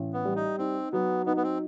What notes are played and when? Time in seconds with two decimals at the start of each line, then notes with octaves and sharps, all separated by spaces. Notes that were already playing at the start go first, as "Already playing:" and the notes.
Already playing: A1
0.13 B3
0.25 G3
0.36 D#4
0.58 C4 D#4
0.93 F#3 B3
1.26 B3 D#4
1.37 B3
1.43 C4